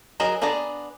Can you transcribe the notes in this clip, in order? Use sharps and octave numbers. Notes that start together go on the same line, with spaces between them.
F#3 F#4 G#4 A#4 D#5
B3 D4 G#4 D5 A#5